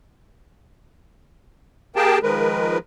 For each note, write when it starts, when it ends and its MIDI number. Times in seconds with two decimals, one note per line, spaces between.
1.96 2.19 58
1.96 2.19 67
1.96 2.19 68
1.96 2.19 70
1.96 2.19 79
1.96 2.19 81
2.23 2.78 51
2.23 2.78 53
2.23 2.78 56
2.23 2.78 70
2.23 2.78 71